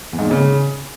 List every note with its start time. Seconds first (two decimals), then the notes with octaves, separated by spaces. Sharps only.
0.13 E2
0.19 G#2
0.25 A#2
0.31 C#3